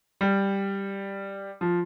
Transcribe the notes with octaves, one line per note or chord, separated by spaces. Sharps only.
G3
F3